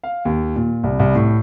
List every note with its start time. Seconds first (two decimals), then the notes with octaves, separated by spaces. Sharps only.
0.04 F5
0.25 D#2
0.56 A#2
0.83 C2
0.99 C2
1.15 A2